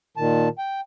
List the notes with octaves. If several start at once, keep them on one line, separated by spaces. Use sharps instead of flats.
A#2 D#3 A5
G5